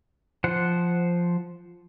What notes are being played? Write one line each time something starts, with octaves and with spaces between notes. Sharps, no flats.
F3 C5 F#5